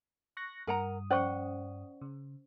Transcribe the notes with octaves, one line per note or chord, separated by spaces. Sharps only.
C#6 F#6 A#6
G2 A#4 F#5 A#5 D#6
C#4 C5 D5 F#5 C#6
C#3